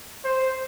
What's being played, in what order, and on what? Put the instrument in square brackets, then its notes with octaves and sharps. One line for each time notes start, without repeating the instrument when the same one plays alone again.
[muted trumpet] C5